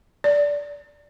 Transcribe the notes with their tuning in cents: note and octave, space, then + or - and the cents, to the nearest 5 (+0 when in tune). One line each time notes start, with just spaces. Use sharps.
D5 -15